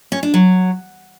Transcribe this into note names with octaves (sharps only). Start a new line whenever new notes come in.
C#4
D4
F#3